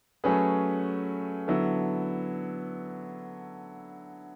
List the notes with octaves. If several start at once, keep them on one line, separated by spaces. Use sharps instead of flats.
F#3 A3 C#4 G#4 B4
D3 F#3 B3 E4 A4